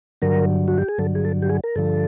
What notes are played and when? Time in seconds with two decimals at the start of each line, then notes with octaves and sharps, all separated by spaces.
0.22 G2 D3 F#3 A#4
0.68 F#4
0.78 G4
0.88 G#4
0.98 G2 D3 F#3 A4
1.15 G#4
1.25 A4
1.42 G4
1.49 G#4
1.64 A#4
1.76 G2 D3 F3 A4